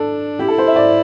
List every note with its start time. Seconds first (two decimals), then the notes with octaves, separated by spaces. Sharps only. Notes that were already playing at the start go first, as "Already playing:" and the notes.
Already playing: D4 A4
0.39 E4 G4
0.48 A4
0.58 C5
0.67 E5
0.76 D5